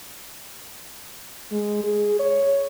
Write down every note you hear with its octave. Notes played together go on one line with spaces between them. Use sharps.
G#3
G#4
C#5